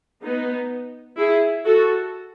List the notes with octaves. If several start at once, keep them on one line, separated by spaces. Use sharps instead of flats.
B3 D#4
E4 G#4
F#4 A4